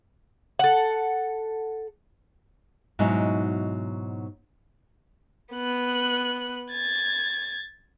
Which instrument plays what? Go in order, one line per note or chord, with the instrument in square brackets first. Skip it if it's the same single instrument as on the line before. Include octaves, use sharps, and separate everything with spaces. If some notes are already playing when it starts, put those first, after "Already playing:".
[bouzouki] A4 F#5
[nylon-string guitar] G#2 B2 F#3 D#4 E4 G#5
[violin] B3 F#6
G#6 A6